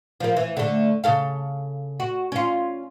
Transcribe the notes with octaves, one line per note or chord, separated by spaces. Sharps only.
F3 A#3
E3
D3 A3
C#3 A4 F5
F#4
C#4 F4